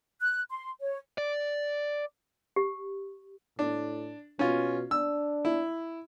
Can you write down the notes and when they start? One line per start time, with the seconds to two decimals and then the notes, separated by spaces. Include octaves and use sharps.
0.21 F#6
0.50 C6
0.80 C#5
1.18 D5
2.56 G4
3.59 A2 D4
4.39 B2 C#4 F4
4.91 D4 E6
5.45 E4